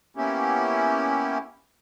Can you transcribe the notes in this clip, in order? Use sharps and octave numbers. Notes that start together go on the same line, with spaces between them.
A#3 B3 C#4 E4 G4